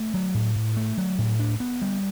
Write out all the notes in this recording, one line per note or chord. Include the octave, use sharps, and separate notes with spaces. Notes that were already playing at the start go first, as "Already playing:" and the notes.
Already playing: A3
F#3
A2
A2
A3
F#3
A2
D4
B3
G3